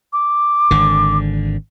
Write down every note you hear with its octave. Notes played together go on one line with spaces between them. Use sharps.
D6
G#1 D3